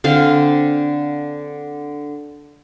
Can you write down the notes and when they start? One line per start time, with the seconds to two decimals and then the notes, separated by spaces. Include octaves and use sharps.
0.04 D3 C4 F5